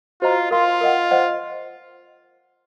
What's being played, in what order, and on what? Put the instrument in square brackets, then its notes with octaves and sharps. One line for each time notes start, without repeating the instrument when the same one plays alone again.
[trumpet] F4 [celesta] F#4 C5 D#5 A#5
[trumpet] F4 [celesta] A#4 F5 C6
[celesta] A#4 D#5 F#5
C5 D#5 F#5